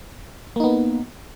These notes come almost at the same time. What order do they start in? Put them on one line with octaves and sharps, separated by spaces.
A#3 D#4 B3